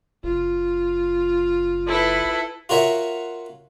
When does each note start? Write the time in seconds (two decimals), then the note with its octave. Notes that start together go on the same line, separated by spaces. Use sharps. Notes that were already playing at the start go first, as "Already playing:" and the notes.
0.24 F#1 F4
1.87 E4 A4 B4
2.69 F4 F#4 A#4 C#5 E5